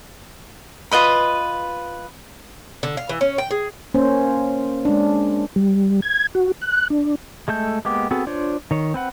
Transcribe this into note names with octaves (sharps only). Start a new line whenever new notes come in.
F4 B4 D#5 B5
D3
F5
E3
C#4
G5
G#4
A#3 C#4 C5
G#3 D4
G3
G#6
F#4
F#6
D4
G#3 A3 A4 G6
G#3 A#3 B3 G4 D6
B3 C4 F#4 G#4 A4
D4 F4 C5 C#5
D#3 C#5
C4 B4 F#5